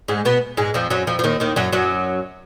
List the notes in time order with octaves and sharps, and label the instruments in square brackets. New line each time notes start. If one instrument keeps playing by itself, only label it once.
[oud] G#2 G#3
B2 B3
G#2 G#3
F2 F3
F#2 F#3
F2 F3
F3
D#2 D#3
D#2 D#3
F#2 F#3
F#2 F#3